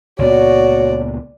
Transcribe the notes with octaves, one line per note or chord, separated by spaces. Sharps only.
C#2 A#2 B3 F#4 C#5 D5